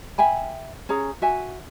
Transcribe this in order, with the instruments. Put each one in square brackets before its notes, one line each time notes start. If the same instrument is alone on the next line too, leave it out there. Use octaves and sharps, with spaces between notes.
[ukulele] E5 G5 G#5 B5
C#4 G#4 A#5
F#4 E5 G#5